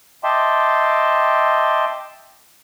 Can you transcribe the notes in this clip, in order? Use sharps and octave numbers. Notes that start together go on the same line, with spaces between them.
D#5 E5 G5 A5 C6 D6